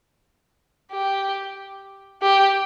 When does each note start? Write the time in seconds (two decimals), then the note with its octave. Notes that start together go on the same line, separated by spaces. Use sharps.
0.92 G4
2.23 G4